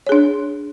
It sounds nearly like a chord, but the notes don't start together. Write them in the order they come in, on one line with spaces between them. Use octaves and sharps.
C#5 G#4 D4